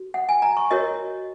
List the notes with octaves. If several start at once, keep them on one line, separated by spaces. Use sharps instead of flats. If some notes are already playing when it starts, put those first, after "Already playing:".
Already playing: F#4
F#5
G#5
A#5
C#6
F#4 A#4 C#5 D#5